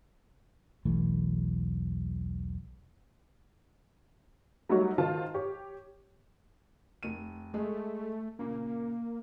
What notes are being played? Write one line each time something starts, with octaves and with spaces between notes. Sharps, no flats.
E1 B1 E3 A3
F#3 G3 A3 D#4 F#4 C#5
D#3 F4 F#4 C5 A5
G4 C#5
F1 D#7
G#3 A3
A#2 C#3 A#3